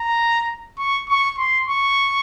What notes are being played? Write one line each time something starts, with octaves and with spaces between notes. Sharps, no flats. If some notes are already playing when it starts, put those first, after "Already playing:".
Already playing: A#5
C#6
C#6
C6
C#6